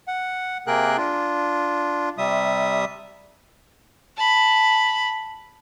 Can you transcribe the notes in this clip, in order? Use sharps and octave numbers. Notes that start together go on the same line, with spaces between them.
F#5
C3 A#3 G#4 A#4 G5 F#6
D4 F4
C3 G3 E5 D#6
A5 B5